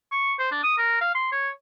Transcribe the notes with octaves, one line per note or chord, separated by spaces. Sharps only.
C#6
C5
D4
D#6
A#4
F5
C6
C#5